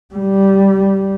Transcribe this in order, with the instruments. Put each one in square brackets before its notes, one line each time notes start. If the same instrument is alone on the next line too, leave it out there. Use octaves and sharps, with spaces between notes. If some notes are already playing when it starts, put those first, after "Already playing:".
[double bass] G3